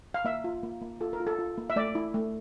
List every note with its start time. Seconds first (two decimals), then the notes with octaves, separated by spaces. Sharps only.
0.14 F5
0.25 A#3 E5
0.44 F4
0.63 A#3
0.81 A#3
1.01 F4 A4
1.13 A#4
1.20 F4
1.27 A4
1.39 F4
1.58 A#3
1.70 E5
1.76 A3 D5
1.95 E4
2.14 A3